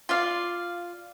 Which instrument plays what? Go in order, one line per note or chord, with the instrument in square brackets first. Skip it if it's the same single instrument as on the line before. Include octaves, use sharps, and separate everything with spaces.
[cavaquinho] F4 D5 F5